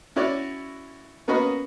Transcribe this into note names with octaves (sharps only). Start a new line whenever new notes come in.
C#4 E4 F#4 C#5 D5
A#3 B3 C#4 F#4 D#5 B5